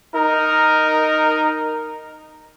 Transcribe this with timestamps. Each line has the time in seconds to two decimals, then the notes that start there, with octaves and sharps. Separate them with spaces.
0.14 D#4 A#4